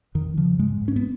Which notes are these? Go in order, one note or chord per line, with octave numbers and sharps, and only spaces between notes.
F2 D#3
C#3 F3
G#2 G#3
G#2
C#4
B3